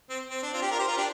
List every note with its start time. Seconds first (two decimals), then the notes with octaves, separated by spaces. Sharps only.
0.10 C4
0.30 C4
0.43 D4
0.53 C4 F4
0.62 D4 G4
0.71 F4 A#4
0.79 G4 C5
0.88 F4 A#4
0.97 D4 G4